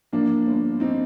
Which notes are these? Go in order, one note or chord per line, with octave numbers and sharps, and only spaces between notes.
F3 A#3 D4
G1
C4 D#4